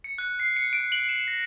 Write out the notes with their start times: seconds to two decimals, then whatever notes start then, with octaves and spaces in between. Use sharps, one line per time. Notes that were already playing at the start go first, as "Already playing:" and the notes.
0.04 C#7
0.18 F#6
0.39 C7
0.56 C#7
0.73 D7
0.92 F#7
1.09 E7
1.28 A#6